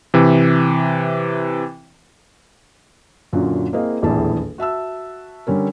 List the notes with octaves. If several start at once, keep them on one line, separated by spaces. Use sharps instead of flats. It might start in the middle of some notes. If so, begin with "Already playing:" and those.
C3 E3
F#2 A#2 D3 F#3
A#3 C4 E4 G#4 D#5 F5
D#1 A#1 E2 A2 G#4 A5
F#4 E5 A5 E6
D3 G3 C#4 A#4